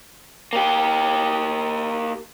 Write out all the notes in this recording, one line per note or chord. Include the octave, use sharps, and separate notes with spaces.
A#3 G4